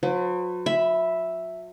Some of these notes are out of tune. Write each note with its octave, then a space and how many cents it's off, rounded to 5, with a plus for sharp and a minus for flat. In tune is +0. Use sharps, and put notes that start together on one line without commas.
F#3 -45 B4 +40
E5 +0 B5 +0